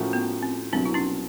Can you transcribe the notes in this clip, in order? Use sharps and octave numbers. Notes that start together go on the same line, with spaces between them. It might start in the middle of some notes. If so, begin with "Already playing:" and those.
Already playing: A2 F3 A#3 C#4 F#4
B3
C4
C2 B2 F#3 C4 D4
E4
C#4 D#4